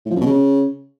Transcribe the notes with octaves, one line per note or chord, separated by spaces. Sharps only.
A2
F3
F#2
B2
C#3